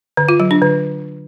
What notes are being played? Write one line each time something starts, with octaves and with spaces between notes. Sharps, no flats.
D3
F4
F#3
D4
D3